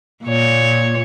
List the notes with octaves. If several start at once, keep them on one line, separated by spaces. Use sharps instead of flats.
A#2 C#5